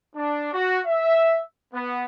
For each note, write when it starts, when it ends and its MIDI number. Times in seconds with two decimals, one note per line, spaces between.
0.16 0.50 62
0.53 0.79 66
0.85 1.39 76
1.74 2.05 59